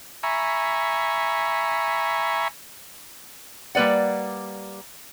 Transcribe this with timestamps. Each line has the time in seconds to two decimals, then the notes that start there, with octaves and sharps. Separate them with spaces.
0.23 E5 G#5 A#5 B5 C#6
3.75 G3 A#3 B4 D5 F#5